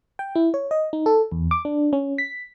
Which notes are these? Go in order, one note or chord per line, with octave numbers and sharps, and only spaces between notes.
G5
E4
C#5
D#5
D#4
A4
E2
D6
D4
C#4
B6